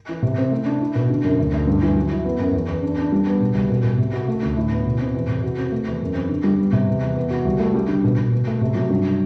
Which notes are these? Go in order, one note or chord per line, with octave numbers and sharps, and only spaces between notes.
E3
C3
C4
A3
D4
E4
B2
D3
F#2
D2
D2
G2
E3
F#3
E4
B3
F#2
E2
E2
D4
D4
G3
B3
B2
C2
B2
B2
C3
F#4
A3
D2
A2
B3
B2
C4
E2
C3
F#4
C4
A3
E2
F#2
C4
D3
G3
B3
C3
E2
E2
B3
F#4
C2
A3
G3
D3
B2
B2
B2
A3
C3
F#3
G2